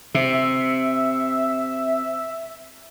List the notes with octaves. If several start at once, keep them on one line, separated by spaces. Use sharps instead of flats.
C3 E5